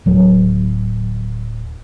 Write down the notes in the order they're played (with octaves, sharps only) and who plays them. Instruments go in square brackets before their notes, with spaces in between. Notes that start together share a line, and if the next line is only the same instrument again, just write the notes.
[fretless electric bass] D1 F#3